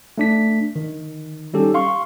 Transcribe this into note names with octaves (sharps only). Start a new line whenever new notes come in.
A3 D4 B6
D#3
G3 C#4 D#4 G4 A4
F5 C6 C#6